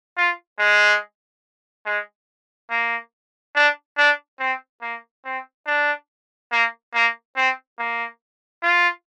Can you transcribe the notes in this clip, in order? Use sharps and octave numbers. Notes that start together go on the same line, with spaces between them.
F4
G#3
G#3
A#3
D4
D4
C4
A#3
C4
D4
A#3
A#3
C4
A#3
F4